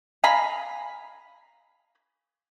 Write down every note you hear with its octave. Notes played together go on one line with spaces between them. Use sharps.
F5 G#5 A#5 B5